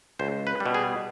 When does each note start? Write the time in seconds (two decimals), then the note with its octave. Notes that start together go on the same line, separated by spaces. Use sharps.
0.19 C#2 C5
0.47 B4
0.60 G3
0.66 B2
0.74 G#4